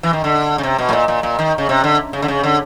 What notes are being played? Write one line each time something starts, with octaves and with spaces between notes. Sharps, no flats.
E3
D#3
D3
C#3
C3
B2
A2
A#2
A#2
A#2
D#3
C#3
C3
D3
C#3
D3
C#3
D3